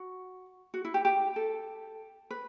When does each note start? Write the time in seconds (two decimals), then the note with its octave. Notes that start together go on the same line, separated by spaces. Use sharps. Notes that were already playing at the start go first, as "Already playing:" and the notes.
Already playing: F#4
0.74 F#4
0.85 E4
0.94 G4
1.05 G4
1.36 A4
2.31 B4